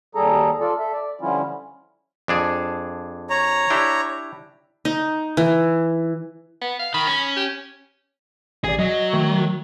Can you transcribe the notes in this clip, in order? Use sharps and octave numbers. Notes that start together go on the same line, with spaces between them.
D#2 G3 G#4 A4 A#5
F4 A4 D5
A4 E5
D5
D3 F3 G3 C#4 E4 F4
F2 D4 G#4
C#5 A#5
D4 E4 G4
D#4
E3
B3
F5
D#3 B5
C#4
G4
A1 G#4 D5
F#3 D#5
D#3 A3